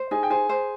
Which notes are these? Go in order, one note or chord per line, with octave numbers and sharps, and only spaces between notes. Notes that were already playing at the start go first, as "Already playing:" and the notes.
Already playing: C5
D#4 G#4 G#5
G5
G#4 C5 G#5
C5